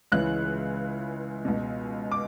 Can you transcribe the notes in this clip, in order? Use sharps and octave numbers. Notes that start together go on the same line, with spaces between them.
C#2 C#3 E3 F#6
C#2 B2
D6